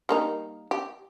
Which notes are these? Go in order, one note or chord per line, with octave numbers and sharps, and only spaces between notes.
G3 A#3 D#4
G4